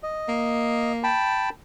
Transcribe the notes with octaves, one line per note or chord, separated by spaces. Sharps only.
D#5
A#3
G5 A5 B5